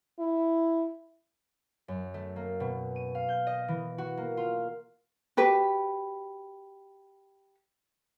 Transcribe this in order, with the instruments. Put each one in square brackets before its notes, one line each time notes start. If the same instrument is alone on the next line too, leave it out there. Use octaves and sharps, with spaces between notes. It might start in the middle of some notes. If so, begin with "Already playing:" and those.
[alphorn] E4
[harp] F#2
A3
A#3
B2
D#7
F5
G6
D#5
E3
F#4
A#3
F4
[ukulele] F#4 G4 B4